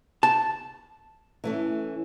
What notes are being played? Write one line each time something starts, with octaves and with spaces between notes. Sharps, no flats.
A5
E3 A3 C#4